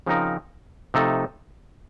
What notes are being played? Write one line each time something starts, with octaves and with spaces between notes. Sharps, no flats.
C#3 F3 C4 D#4 A#4
C3 F3 A3 D#4 A4